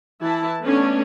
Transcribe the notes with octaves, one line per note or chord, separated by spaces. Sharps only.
E3 E4 A5
A3 B3 C#4 D4